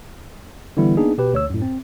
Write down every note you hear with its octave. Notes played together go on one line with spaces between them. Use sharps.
D3 E3 G3 B3 E4
A#3 B3 D4 D#4 G#4
B2 G4 B4
D2 C#5 E6
F#2 A2
C4